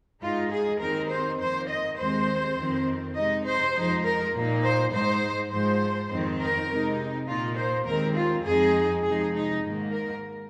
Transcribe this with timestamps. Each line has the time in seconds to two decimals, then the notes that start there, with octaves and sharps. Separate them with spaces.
0.22 G#2 G#3 D#4 F4
0.52 G#4
0.81 D#2 D#3 C4 D#4 A#4
1.10 C5
1.40 F2 D#3 A#3 C5
1.69 D#5
1.99 D#2 D#3 G#3 C4 C5
2.57 F2 D#3 C4
3.16 C3 G#3 D#4 D#5
3.45 C5
3.75 F2 F3 G#3 D#4
4.05 A#4
4.34 A#2 A#3 D#4
4.63 C5
4.92 G#2 G#3 D#4 C5
5.51 G#2 F3 G#3 C5
6.10 F2 D#3 C4 D#4
6.39 A#4
6.68 C3 G#3 D#4
7.28 A#2 A#3 D#4 F4
7.57 C5
7.86 D#2 D#3 G#3 C4 A#4
8.15 F4
8.44 F2 F3 G#3 C4 D#4 G#4
9.03 C3 F3 G#3 D#4 G#4
9.33 D#4
9.63 G#2 D#3 A#3
9.92 A#4